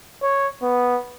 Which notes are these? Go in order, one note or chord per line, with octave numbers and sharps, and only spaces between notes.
C#5
B3